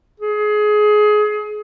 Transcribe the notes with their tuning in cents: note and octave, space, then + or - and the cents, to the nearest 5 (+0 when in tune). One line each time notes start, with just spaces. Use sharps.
G#4 +25